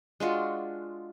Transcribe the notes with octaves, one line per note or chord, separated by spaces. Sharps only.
G#3 D4 F4 F#4